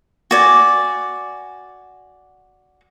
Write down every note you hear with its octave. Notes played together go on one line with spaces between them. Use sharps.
F#4 D5 G#5